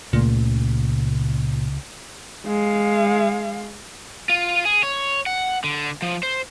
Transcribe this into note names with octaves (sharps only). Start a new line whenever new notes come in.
C#2 A#2 C#3 A3
G#3 F5
F4
G#4
C#5
F#5
D3
F3
C5